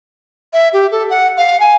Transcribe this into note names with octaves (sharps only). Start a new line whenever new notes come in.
E5
G4
A4
F#5
F5
G#5